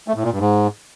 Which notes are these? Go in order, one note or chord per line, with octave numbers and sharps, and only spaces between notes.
A3
A2
A#2
G2
G#2